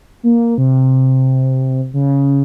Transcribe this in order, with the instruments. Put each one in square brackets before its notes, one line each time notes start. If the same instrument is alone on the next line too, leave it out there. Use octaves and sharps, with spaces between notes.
[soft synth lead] A#3
C3
C#3